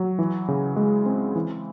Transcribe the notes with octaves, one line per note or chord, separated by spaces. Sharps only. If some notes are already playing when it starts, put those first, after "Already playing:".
Already playing: F#3
E3
C#3
G#3
C4
E3